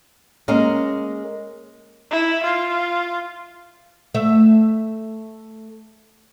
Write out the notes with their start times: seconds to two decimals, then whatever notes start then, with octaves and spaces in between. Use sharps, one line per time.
0.48 G#3 A#3 C#4 A#4
2.11 E4
2.44 F4
4.14 A3 E5